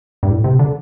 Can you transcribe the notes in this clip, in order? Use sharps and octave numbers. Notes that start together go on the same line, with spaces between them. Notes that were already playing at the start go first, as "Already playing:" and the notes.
G2
A2
C3
D3